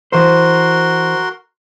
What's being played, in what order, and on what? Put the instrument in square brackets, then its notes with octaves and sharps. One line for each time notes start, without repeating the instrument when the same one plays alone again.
[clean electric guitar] E3 C5 [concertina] F#4 A#4 C6